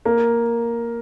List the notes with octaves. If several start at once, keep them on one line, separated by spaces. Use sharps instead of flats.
A#3